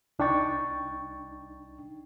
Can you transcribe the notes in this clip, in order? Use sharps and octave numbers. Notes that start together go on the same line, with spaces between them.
C2 D4 D#4 G5 C#6 A6